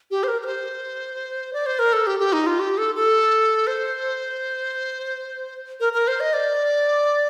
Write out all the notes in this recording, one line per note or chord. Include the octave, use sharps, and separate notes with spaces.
G4
C5
A#4
A#4
C5
D5
C5
A#4
A4
G4
G4
D#4
F4
G4
A4
A4
C5
A#4
A#4
C5
D#5
D5